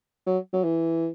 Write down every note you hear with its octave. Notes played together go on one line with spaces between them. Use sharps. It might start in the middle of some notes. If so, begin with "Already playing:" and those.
F#3
F#3
E3